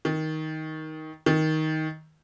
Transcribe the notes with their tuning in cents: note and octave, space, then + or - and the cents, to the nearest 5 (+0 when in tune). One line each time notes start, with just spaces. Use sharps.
D#3 +15
D#3 +15